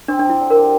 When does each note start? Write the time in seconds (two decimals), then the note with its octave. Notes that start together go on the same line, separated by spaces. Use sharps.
0.08 C4 D4
0.19 D4
0.25 F3
0.30 E4
0.40 D3
0.50 G4 A#4